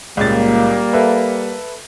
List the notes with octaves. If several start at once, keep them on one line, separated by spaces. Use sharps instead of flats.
C#2 A#2 G3 A#3 A6
A4 B4 E5